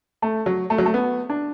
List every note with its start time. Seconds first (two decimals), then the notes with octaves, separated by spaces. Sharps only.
0.22 A3
0.46 F#3
0.70 A3
0.78 F#3
0.86 A3
0.94 B3
1.30 D4